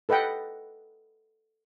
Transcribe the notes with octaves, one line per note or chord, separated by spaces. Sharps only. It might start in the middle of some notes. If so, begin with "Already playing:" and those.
A4 B4 D#5 F#5 G5